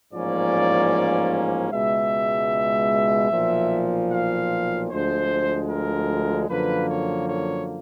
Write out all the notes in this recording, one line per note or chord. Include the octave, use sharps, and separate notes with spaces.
A1 G#2 F3 A#3 C#4 D5
C#2 B2 G#3 E5
B1 A#2 F3
F5
D2 D3 F3 G#3 C5
A#4
F#2 D3 F3 A#3 B4
C#5
C#5